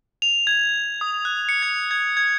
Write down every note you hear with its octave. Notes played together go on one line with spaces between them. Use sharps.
F7
G#6
D#6
F#6
C#7
G#6
G#6
G#6